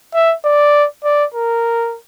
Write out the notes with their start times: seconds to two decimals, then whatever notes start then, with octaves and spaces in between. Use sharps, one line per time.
0.14 E5
0.45 D5
1.04 D5
1.34 A#4